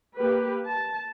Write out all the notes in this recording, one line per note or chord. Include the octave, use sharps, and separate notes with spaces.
A#3 G4 B4
A5